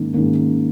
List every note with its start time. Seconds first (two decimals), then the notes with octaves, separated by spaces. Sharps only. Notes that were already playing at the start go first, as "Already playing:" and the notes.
Already playing: G#2 D#3 A#3 C#4
0.13 G#2 D#3 A#3 C#4